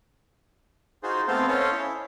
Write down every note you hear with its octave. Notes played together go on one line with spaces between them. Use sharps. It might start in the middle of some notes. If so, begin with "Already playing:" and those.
D#4 F4 F#4 G#4 C5
A3 B3 C4 A4 C5 F5
C#4 A4 C5 C#5 D#5 F5
E4